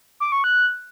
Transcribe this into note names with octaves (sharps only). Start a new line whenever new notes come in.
D6
C#6
F#6